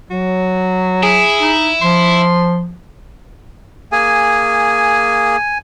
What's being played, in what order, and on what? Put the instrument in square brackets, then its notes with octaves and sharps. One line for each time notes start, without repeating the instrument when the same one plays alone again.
[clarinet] F#3 [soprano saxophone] F#4
[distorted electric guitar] E4 [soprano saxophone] G#4
[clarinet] D#4
[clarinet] F3 [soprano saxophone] C6
[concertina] A#3 G#4 [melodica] G#5